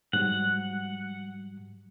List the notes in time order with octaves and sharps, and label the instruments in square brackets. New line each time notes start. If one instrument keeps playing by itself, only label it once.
[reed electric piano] G#2 F#3 G3 [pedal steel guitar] F#5